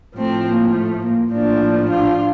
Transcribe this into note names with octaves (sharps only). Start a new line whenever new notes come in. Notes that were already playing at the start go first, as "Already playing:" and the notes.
A2 F3 A3 C4
A#3
A3
A#3
A2 F3 A#3 D4
D4 F4